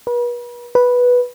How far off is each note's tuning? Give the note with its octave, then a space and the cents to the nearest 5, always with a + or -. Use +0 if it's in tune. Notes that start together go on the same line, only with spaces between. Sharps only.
B4 -40
B4 -5